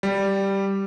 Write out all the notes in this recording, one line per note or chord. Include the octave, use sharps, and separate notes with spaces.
G3